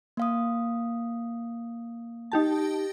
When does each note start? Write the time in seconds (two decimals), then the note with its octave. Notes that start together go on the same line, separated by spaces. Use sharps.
0.17 A#3 F5 D#6
2.32 D#4 G4 A5